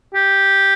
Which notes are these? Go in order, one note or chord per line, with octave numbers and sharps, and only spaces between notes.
G4